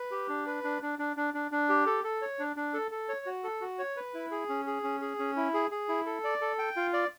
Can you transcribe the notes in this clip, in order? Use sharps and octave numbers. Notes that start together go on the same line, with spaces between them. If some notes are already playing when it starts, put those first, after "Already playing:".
Already playing: B4
G4
D4
B4
D4
D4
D4
D4
D4
D4
G4
A4
A4
C#5
D4
D4
A4
A4
C#5
F#4
A4
F#4
C#5
B4
E4
G#4
C#4
G#4
C#4
G#4
C#4
E4
G#4
G#4
E4
A4
D5
A4
G5
F4
D5